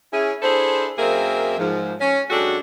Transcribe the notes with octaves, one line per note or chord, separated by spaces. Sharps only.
C#4 E4 G#4
D4 E4 G#4 A4 C5
F#2 A#3 C4 G#4 A#4 E5
G#2 F3
C#4
F#2 G#3 D4 F#4 G4 A4